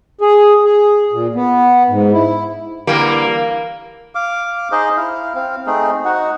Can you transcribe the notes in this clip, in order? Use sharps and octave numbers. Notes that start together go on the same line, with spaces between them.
G#4
G#4
A#2
B3
G#2
E4
D3 E3 G3 A#3
F5 D6
D#4 G#4 C5 D#5
E4 F5
C4 F5
A3 C4 D#4 G#4
D#4 F#4 F#5